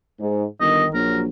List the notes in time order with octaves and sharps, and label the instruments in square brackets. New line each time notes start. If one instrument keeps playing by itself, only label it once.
[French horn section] G#2
[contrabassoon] G1 [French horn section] D#3 [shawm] D#5
[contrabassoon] A#1 [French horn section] F#3 [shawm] A#4